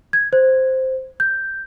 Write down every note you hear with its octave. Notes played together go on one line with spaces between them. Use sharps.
G#6
C5
G6